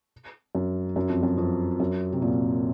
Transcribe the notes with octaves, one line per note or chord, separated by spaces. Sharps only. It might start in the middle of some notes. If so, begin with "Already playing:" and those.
F#2
F#2
F2
F#2
F2
F#2
C3
A#2